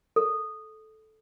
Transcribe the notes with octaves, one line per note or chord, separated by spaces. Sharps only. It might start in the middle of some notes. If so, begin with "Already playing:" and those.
A4